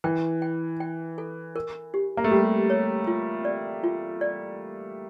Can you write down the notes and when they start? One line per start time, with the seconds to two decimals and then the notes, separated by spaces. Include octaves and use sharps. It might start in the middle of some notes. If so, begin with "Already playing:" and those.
0.04 E3 G5
0.42 G5
0.80 G5
1.18 A4
1.56 A#4
1.94 G4
2.17 A#3
2.24 A3
2.31 G3 G4
2.70 C#5
3.07 F4
3.45 D5
3.83 F4
4.21 D5